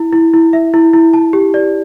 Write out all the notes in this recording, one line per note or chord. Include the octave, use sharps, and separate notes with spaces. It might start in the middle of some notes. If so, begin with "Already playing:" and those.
Already playing: E4
E4
E4
E5
E4
E4
A5
G4
D5